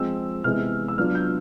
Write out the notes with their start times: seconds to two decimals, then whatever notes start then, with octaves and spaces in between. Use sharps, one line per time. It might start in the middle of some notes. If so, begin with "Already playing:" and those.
Already playing: F3 G#3 C4 E6
0.44 C3 E3 G#3 B3 F6
0.88 E6
0.98 F#3 B3 D4 F4 F6
1.15 G6